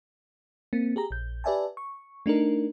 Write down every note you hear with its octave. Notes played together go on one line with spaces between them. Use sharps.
A#3 C4
G4 G#4 A#5
A#1 G6
G4 B4 D5 E5 G#5 A5
C#6
A3 D4 D#4 A#4